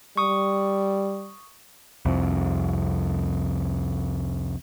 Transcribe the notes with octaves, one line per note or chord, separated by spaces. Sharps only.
G3 C#6 D#6
C2 F2